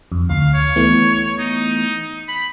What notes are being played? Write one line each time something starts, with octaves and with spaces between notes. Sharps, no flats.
F2
D2 F5
C#5
E3 A3 B3
D#4
B5